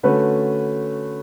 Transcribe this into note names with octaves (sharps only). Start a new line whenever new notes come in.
D3 A3 C#4 F#4 B4